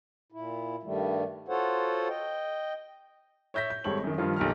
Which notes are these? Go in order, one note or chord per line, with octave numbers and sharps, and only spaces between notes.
A#2 E4
G2 D#3 G3 A3
F4 F#4 A4 C5 C#5 F#5
D#5 G5
C#5 E5 G6 A#6 B6
G6
G#1 G3 G#3 A4 C#5 F#7
F#2 D#3
G2 D#3 F3 F4
B1 A#2 G4 A4 A#5 F6